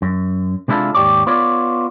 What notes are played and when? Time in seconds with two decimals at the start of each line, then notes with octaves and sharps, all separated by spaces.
0.02 F#2
0.68 C3 G#3 D4 E4 F4 A4
0.95 D#2 G#2 B2 G4 C#5 D5
1.27 B3 F4 C#5 D5